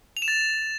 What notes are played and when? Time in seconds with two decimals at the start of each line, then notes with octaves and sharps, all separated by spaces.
0.17 F7
0.22 E7
0.28 A6